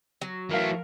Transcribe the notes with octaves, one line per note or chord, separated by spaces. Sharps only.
F#3
E3 A3 A#4 F5